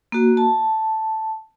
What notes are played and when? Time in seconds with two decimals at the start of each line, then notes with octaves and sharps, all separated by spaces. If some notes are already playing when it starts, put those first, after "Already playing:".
0.12 A#3 F#4
0.37 A5